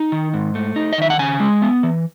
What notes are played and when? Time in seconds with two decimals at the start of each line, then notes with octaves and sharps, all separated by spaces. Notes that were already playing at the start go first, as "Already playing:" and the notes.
Already playing: D#4
0.12 D#3
0.34 G#2
0.55 A3
0.76 D#4
0.93 D#5
0.98 D#3 E5
1.10 F#5
1.19 C#3 G#5
1.40 G#3
1.62 B3
1.83 E3